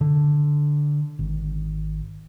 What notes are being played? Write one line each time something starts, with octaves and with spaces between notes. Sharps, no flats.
D3
G#1